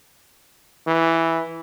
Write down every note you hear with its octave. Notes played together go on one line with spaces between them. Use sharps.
E3